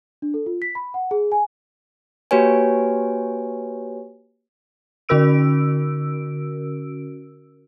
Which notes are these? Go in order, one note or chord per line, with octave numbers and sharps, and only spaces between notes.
D4
A4
F4
B6
B5
F#5
G#4
G#5
A#3 F#4 G4 B4 C#5 G#5
D3 C#4 F#4 A#4 E6 D7